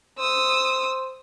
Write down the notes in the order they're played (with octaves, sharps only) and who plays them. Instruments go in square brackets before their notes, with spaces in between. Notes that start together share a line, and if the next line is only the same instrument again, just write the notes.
[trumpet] C5 [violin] D#6 E6